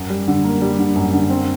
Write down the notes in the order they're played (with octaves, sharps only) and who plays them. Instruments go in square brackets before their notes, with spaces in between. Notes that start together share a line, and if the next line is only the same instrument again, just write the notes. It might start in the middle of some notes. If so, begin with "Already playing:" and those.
Already playing: [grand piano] F#2
G3
D3
A#3
G3
D3
F#2
D3
C4